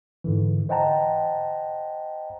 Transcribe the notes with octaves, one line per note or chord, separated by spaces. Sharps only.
G#2 D3 E3
C5 D#5 F#5 G5 A5 A#5